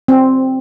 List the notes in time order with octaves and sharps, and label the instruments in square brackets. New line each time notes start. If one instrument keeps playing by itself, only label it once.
[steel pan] C4